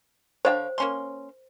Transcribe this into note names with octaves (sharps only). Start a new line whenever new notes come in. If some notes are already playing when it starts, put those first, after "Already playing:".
D3 D4 C5 C#5 F5 G5
A#3 C#4 A#4 C6